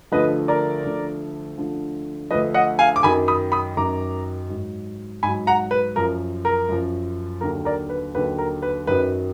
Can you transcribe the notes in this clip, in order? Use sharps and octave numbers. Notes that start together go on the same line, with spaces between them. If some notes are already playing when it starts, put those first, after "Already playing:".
D2 D3 F3 B4 D#5
A#4 D5
D2 D3 F3
D2 D3 F3
D2 D3 F3 B4 D#5
D#5 F#5
F5 G#5
D6
F#2 D#3 F#3 G#5 B5
B5 D#6
B5 D#6
F#2 D#3 F#3 A#5 D6
G#2 F#3
G#2 F#3 G#5 B5
F#5 A#5
B4
F#2 F3 A#4
A#4
F#2 F3
D#2 D3 F#3 A#4
A#4 D5
B4
D#2 D3 F#3 B4
A#4
B4
F#2 D#3 F#3 B4